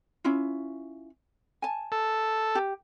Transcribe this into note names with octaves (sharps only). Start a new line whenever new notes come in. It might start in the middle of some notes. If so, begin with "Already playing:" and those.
C#4 E4 F4
G#5 A5
A4
G4